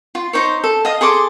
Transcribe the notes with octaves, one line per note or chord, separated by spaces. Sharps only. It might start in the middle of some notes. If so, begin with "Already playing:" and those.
F4
D#4 C5 C#5
A4
D#5 F5 D#6
G#4 A4 C6 D6